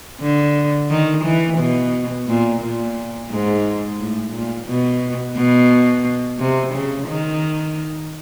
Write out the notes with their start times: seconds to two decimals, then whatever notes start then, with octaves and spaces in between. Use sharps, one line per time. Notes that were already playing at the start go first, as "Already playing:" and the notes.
0.21 D3
0.90 D#3
1.25 E3
1.58 B2
2.28 A#2
2.62 A#2
3.30 G#2
3.99 A2
4.33 A#2
4.67 B2
5.36 B2
6.39 C3
6.74 C#3
7.08 D#3